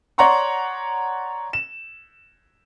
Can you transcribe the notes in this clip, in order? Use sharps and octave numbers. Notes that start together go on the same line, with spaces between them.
C#5 D5 F#5 A#5 C6 C#6
E7